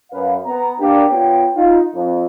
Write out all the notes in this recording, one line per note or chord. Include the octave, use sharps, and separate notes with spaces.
F#2 B4 F5
B3 A#5
A#3 D4 G4
B3 F4 C#5 G5
D#4 F4
F2